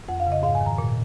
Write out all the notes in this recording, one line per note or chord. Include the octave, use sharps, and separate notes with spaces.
F2 F#5
F5
C#3
D#5
G#2 F5
G#5
D#3
A#5
A#2